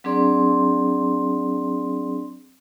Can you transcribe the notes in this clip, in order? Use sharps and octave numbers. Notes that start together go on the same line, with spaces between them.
F#3 C4 D4 G#4 D5 C6